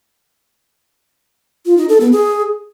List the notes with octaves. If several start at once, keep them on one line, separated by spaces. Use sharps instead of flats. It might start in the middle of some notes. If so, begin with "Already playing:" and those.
F4
D#4
A4
B3
G#4